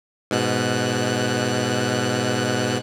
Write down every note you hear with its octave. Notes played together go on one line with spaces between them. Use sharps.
G#2 B2 F#6